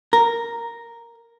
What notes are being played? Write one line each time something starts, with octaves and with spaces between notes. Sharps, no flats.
A#4